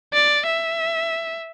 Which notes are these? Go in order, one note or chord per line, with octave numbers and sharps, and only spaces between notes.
D5
E5